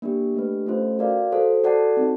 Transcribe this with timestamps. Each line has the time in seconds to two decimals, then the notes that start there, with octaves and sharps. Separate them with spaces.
0.02 A#3 D4 G4
0.34 A3 D4 G4 B4
0.66 A3 C#4 F4 A4 C5
0.99 F#4 A#4 D5 F5
1.32 F#4 A4 C5
1.64 F#4 A4 D5 F#5 A5
1.97 C4 D#4 F#4